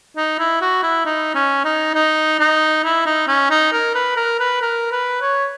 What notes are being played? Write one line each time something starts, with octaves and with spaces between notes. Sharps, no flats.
D#4
E4
F#4
E4
D#4
C#4
D#4
D#4
D#4
E4
D#4
C#4
D#4
A#4
B4
A#4
B4
A#4
B4
C#5